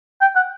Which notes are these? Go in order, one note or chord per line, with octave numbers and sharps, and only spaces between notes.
G5
F#5